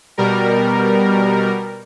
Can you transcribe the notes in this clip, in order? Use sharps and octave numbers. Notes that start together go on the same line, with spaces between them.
B2 G3 A#4